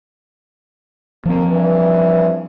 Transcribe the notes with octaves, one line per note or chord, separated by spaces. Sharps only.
D#2 F3 A#3 C4
G2 E3